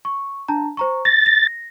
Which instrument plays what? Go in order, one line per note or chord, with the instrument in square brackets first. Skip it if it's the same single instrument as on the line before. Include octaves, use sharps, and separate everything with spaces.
[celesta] C#6
D4 A5 A#5
C5 A#5 C#6
[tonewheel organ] A6 [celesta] A#6
[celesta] A#6